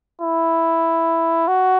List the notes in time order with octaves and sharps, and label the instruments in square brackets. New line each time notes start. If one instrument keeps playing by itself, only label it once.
[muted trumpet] E4
F#4